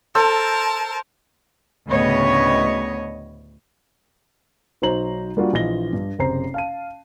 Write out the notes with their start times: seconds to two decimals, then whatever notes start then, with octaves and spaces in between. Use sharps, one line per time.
0.15 A4 A#4 C5 A5 E6
1.88 D2 A2 C#3 B3 C#5 D#5
4.82 B1 F#3 D#4 C5 A#5 F#7
5.37 G3 A#3 D4 F4 F#4
5.53 A#1 E3 F4 D#5 A#6 G7
5.93 G2
6.19 F#1 C3 C5 A#5 C7
6.54 F5 A5 D#7